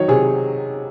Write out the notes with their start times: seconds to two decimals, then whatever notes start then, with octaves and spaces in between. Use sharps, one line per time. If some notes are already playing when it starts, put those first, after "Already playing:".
Already playing: D#3 F#3 C#5
0.08 C3 G#4